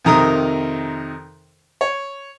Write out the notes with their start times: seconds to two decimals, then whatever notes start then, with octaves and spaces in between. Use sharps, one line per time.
0.05 F2 C3 D#3 A#4 A#5 D#6
1.81 C#5